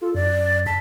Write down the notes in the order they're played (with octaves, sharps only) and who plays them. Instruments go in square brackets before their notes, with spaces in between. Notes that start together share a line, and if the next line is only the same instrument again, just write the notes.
[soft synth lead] F4 [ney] A4
[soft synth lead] F#2 [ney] D5
[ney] A5 [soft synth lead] B6